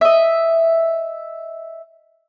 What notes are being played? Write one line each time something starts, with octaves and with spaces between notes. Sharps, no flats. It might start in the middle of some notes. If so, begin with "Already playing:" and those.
D#5 E5